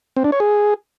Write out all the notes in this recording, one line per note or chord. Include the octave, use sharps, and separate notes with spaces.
C4
D4
C#5
G#4